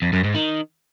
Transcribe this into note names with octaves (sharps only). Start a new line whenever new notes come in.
F2
F#2
G#2
D#3